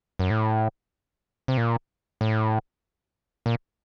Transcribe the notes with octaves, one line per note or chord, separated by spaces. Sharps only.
F#2
A2
C3
A#2
A2
A#2